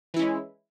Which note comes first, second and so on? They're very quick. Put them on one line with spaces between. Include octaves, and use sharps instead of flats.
E3 E4 C#4 G#3